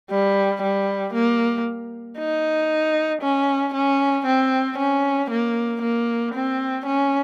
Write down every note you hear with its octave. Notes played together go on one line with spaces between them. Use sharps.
G3
G3
A#3
D#4
C#4
C#4
C4
C#4
A#3
A#3
C4
C#4